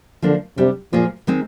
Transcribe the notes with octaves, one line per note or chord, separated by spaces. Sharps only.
D3 F3 A#3 D4
C3 G3 D4 G4
A#2 F3 A#3 F4 G#4
D#3 G#3 C4